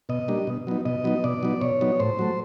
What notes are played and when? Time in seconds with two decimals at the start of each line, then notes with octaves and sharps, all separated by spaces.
0.09 B2 D#5
0.28 G3 A#3 D4
0.47 B2
0.67 F#3 B3 D#4
0.85 B2 D#5
1.04 F#3 B3 D#4
1.24 B2 D5
1.43 F#3 B3 D#4
1.61 B2 C#5
1.81 F#3 B3 D#4
2.00 A2 C5
2.19 F#3 A3